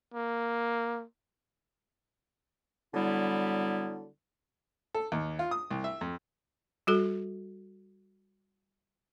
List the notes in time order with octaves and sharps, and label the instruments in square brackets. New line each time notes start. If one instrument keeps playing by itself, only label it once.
[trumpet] A#3
[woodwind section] D3 F#3 G3 B3 E4
[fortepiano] A4
D#2
F4
D#6
C2
E5
F2
[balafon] G3 F#4 A4